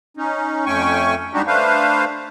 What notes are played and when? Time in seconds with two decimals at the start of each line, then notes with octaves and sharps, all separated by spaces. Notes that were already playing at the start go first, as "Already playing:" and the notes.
0.17 C#4 D#4
0.66 F2 A3 C#4 G5 G#5 C#6
1.34 G3 G#3 D4 D#4 F#4 G4
1.47 A3 D4 B4 C5 F5